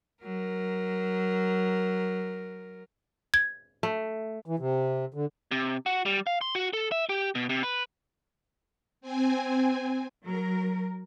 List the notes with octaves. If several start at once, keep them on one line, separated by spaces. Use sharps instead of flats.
F#3 A#4
G#6
A3
E3
C3
D3
C3
F#4
G3
F5
C6
F#4
A4
E5
G4
B2
C3
B4
C4 G#5
F#3 A#4